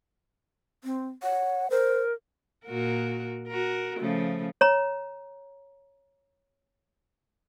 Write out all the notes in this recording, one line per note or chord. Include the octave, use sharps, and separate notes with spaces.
C4
C#5 F#5
A#4 C5
A#2 F#4 A#4
F#4 A#4
C#3 F3 A3
C#5 A#5